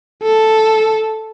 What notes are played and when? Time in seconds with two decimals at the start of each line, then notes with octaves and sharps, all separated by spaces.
0.22 A4